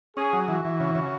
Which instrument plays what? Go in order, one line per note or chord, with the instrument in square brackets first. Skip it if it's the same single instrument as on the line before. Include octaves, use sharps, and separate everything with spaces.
[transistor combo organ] C#4 [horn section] G#4
[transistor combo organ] F#3
[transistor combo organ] E3 [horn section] F#4
[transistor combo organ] E3
C#3
C#3